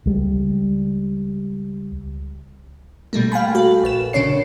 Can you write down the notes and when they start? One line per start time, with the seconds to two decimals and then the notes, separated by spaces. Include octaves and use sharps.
0.06 C#2 G3
3.13 B2 G3 A3 A#3
3.32 F5 G5 G#5 B5
3.55 F#4 A4
3.84 A#1 B4 E7
4.13 A#1 C#3 C#4 D4 C#5 C7